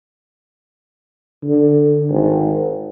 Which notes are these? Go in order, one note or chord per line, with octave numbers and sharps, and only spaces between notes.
D3
G#1